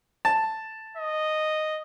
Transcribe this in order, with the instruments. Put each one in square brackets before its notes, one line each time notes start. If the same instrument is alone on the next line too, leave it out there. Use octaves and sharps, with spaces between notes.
[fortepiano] A5
[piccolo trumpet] D#5